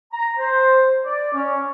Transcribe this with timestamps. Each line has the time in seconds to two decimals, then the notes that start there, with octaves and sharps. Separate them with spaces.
0.13 A#5
0.38 C5
1.05 D5
1.34 C#4